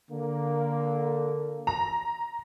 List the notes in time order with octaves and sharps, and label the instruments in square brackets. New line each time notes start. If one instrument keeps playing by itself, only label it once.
[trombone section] D3 A#3
[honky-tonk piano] A#5